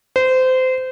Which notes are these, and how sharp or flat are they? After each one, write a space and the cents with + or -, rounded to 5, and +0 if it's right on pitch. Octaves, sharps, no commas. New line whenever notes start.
C5 -25